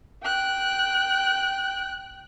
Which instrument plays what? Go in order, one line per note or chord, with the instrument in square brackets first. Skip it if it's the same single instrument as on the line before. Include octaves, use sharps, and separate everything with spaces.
[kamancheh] G5 F#6